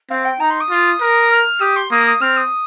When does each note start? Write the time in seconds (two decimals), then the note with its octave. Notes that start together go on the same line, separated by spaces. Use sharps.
0.10 C4 F5
0.24 G5
0.40 D#4 A#5
0.50 C6
0.60 D#6
0.70 F4
1.01 A#4
1.31 F6
1.60 G4 D#6
1.76 C6
1.91 A#3 D#6
2.06 D#6
2.21 C4 F6
2.36 D#6